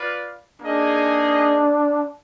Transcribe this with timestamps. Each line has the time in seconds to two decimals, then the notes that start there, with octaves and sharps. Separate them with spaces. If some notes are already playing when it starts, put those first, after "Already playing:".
Already playing: F4 B4 D5 F5
0.61 A#3 D4 D#4 G#4 D#5